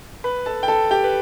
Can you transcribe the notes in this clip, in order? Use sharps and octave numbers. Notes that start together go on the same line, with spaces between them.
B4 B5
A4 A5
G5
A4 A5
G4 G5
B4